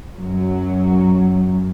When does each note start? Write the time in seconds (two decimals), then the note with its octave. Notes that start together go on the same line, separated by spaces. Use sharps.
0.17 F#2 F#3